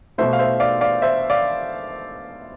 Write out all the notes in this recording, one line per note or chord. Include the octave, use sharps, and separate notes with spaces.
B2 A3 C5 E5
F5
C5 E5
D5 F5
D5 F5
C5 E5
D5 F5